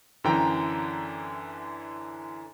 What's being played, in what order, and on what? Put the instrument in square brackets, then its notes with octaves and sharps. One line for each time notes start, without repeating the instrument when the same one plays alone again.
[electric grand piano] F#2 D3 E3 G5 A#5